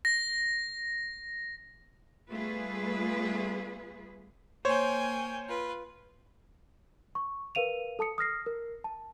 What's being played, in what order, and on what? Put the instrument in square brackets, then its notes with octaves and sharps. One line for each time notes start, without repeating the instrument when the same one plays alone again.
[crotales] A#6
[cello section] G3 A3 B3 F4 G#4 B4
[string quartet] A#3 G5 G#5 [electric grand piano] C5 C#5
[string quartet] F4 B4
[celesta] C#6
A#4 B4 F5 D#7 F7
A4 A5 D#6 C#7
D#6 F6 A#6 C7
A#4
A5